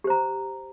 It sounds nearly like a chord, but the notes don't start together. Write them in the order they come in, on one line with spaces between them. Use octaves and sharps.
G4 C5 A#5